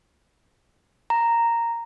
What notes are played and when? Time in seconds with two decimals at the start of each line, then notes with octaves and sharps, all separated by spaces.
1.10 A#5